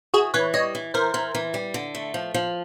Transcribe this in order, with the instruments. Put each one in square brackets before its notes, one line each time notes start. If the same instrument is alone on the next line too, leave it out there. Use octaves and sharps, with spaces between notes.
[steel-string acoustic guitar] E3 [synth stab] F#4 G#4
[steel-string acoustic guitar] E3 [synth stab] B4 C#5
[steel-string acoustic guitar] G3 [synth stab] C#5 D#5
[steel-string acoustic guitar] E3
[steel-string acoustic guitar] E3 [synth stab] A#4 C5
[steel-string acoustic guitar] E3
E3
G3
D3
A3
F3
F3